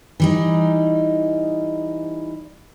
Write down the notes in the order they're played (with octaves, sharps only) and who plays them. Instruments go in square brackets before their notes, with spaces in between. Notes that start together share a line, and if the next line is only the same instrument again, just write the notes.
[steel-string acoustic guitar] E3 G3 D#4